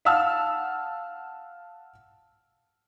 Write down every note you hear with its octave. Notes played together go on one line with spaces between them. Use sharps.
F5 F#5 A5 E6 F6